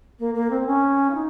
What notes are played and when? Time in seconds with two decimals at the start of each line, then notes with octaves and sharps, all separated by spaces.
0.19 A#3
0.34 A#3
0.50 C4
0.66 C#4
1.10 F4
1.14 D#4